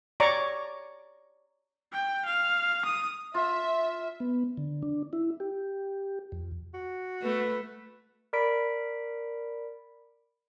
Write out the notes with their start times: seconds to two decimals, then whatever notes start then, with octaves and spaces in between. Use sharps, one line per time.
0.20 C#5 D5 A#5 C#6 D6
1.93 G5
2.25 F5
2.85 D#6
3.34 F4 E5
4.20 B3
4.57 D3
4.82 D4
5.13 E4
5.40 G4
6.32 F2
6.74 F#4
7.22 A3 B4
8.33 A#4 D5 B5 B6 D7